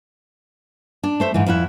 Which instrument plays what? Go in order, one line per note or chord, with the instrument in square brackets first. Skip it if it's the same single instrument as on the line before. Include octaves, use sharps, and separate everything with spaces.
[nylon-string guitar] D4
A3 C5 E5
G#2 D3 E3
F2 F3 E4 F#5